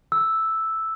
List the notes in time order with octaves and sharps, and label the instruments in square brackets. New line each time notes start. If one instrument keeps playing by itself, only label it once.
[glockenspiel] E6